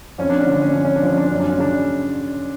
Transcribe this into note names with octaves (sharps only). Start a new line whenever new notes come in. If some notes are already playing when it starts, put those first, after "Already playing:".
F2 C#4
D4
C#4
D3 D4
C#4
F2 D4
C#4
D4
F3 C#4
D4
F#2 C#4
D4
C#4
C#3 D4